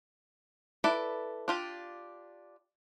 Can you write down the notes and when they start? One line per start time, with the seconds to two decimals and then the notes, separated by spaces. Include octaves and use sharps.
0.84 E4 A4 B4 D5
1.48 D4 F4 G4